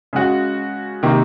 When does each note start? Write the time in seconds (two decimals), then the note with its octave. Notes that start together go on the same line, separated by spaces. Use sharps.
0.13 C#3 G#3 C#4 F#4
1.03 C3 D#3 A#3